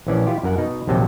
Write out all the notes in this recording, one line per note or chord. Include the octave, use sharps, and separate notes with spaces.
A#1 E3 C#4 D5
E4 F4 G4
F#2 A#4 F#5
B2 D#4
A#1 D#2 C3 F#3 G5 A5